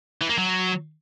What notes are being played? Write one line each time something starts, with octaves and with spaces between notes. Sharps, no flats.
E3
A#3
F#3